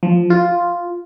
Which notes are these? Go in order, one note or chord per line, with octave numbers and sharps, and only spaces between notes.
F3
F4